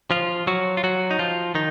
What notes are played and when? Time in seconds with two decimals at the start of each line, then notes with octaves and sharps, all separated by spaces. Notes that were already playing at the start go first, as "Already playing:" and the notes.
0.11 F3 F4
0.47 F#3 F#4
0.77 F4
0.84 F#3 F#4
1.11 D#4
1.19 F3 F4
1.55 D#3 D#4